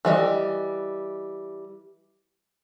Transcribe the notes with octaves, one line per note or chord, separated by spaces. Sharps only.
E3 G3 D#5